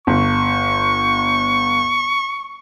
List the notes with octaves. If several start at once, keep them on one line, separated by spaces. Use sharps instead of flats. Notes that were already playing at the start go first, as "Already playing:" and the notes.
G1 C#6